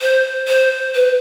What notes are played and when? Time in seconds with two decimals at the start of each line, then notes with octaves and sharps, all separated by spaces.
0.02 C5
0.48 C5
0.95 B4